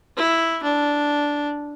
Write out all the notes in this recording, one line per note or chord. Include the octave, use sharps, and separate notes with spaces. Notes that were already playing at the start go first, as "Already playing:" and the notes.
E4
D4